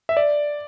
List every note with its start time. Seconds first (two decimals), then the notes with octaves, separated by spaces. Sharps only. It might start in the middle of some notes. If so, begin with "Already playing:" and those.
0.09 E5
0.17 D5